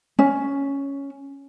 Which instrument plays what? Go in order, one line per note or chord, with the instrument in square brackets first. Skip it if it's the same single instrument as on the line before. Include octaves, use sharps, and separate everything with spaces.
[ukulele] C#4